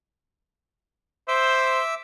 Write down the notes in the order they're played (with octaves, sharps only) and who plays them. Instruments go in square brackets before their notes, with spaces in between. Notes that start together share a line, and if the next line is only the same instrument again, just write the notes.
[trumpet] C5 [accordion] E5 D6 E6